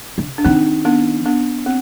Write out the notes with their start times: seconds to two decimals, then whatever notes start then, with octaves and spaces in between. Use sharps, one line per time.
0.18 D3
0.38 D4
0.44 D#3 C4 D#4
0.85 B3 D4
1.26 B3 D4
1.66 C4